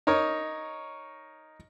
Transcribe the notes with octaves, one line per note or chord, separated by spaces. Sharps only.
D#4 A#4 C#5